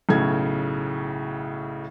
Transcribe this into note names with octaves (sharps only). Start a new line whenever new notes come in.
B1 A2 C#3 G#6